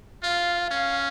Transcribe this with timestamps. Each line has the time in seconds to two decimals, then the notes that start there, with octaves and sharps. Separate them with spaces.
0.23 F4 F5
0.70 C#4 F5